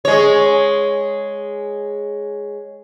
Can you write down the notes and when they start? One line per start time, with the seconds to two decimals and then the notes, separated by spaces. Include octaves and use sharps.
0.05 G#3 C#5